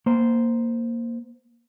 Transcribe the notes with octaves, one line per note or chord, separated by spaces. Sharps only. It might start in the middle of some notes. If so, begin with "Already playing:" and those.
A#3 C5